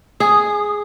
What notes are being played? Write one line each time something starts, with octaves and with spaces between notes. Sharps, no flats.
G#4 D#6